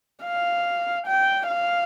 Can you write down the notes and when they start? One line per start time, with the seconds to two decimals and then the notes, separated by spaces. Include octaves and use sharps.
0.25 F5
1.07 G5
1.48 F5